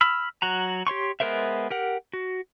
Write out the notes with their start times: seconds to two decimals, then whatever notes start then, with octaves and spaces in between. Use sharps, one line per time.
0.01 B5 E6 F6
0.42 F#3 F#4 A#5
0.87 G4 C#5 C6 C#6
1.20 G#3 B3 A#4 C5 E5
1.70 G4 A#4 F#5
2.13 F#4